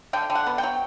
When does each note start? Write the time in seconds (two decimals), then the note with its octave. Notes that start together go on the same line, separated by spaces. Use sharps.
0.13 D3 G5
0.30 D3
0.35 F#5
0.47 B3
0.58 G5
0.63 F#3